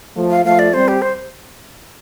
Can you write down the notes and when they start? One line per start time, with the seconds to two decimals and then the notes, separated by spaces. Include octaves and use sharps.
0.15 F3 A3
0.30 F5
0.44 F3 A3 F5
0.59 D5
0.73 G3 C4 C5
0.88 G4
1.02 C5